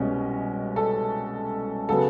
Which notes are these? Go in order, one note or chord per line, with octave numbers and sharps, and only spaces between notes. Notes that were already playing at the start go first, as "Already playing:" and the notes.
Already playing: C2 B2 G#3 C#4
A4
C#3 F#3 B3 A4